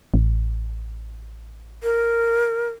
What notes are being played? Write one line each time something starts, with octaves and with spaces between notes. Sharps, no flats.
A1
A#4